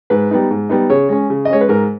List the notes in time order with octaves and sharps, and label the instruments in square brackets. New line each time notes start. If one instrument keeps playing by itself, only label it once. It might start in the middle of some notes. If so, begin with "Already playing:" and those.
[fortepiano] G#2 B4
G3 B3 D#4
G#2
G3 B3 D#4
C#3 C#5
G#3 C#4
C#3
D#5
G#3 C#4 C#5
B4
G#2 A#4